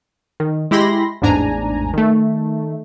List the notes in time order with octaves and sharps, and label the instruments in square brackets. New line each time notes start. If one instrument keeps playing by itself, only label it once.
[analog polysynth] D#3
G#3 E4 G4 B5 C6 A#6
A1 E2 G#2 D4 G#5 A#5
D#3 A3